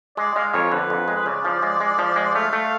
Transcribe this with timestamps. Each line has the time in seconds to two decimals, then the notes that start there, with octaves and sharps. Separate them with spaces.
0.17 G#3 D5
0.36 G#3 F5
0.54 F2 C#5
0.72 D3 B4
0.90 F2
1.08 G#3
1.26 C#3 D5
1.45 F3
1.62 G#3
1.80 G#3
1.98 F3
2.16 G#3
2.35 A3 F5
2.53 A3